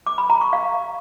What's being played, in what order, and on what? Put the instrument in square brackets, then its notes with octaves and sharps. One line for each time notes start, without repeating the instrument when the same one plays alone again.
[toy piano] D6
B5
A#5
C#6
F5